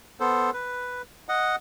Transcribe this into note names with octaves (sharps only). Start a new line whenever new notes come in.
B3 A4 C5
B4
D#5 F#5